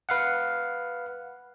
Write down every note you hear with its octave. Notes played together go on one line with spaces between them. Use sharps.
B4 F5 F#5